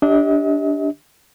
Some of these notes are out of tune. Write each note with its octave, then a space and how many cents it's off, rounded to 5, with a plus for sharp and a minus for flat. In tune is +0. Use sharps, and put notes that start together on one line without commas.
D4 -10 G4 +0 D#5 +40